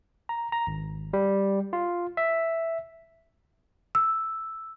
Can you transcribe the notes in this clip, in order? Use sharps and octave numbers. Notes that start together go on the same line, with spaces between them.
A#5
A#5
G#1
G3
F4
E5
E6